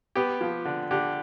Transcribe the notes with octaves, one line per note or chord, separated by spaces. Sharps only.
B3 G4
F3
D3
D3 G4